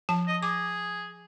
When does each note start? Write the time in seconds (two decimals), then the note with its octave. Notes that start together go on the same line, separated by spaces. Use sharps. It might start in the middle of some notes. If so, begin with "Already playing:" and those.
0.09 F3 A5
0.27 D#5
0.43 G#4 D6